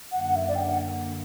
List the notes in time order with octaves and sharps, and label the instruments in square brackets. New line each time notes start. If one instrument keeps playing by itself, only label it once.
[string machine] F#2 D3 A#3 [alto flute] F#5
[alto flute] F#5
E5
D5
G5
F#5